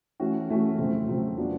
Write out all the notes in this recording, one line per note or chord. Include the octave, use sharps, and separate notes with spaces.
E3 A3 C#4 F#4
E3 A3 C#4 F#4
F2 C#3 F#3 A3 C4
F2 C#3 F#3 A3 C4
F#3 B3 D4 F4